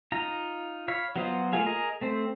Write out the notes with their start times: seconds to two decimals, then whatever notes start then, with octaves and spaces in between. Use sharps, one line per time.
0.12 D#4 F4 A#5
0.88 C#5 F5 B5
1.16 F#3 B3 F4 C5 D#5
1.53 A3 A#3 F4 G#4 F5
1.66 G#4 A#4 D#5 A#5
2.01 A3 C4 C5